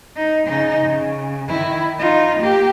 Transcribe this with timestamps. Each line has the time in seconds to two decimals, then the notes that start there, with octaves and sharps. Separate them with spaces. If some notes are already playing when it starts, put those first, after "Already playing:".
0.16 D#4
0.46 C#3 D#4
0.86 C#3
1.48 D#3 E4
1.98 D#4 F4
2.40 A#3 G4